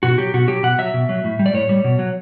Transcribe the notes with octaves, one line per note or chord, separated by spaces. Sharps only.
B2 F#4
F#3 G4
B2 F#4
F#3 G4
B2 F#5
F#3 E5
B2
F#3
A2
G3
D5
A2 C#5
G3
B2
F#3